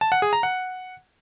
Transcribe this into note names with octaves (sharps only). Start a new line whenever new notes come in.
A5
F#5
G#4
A#5
F#5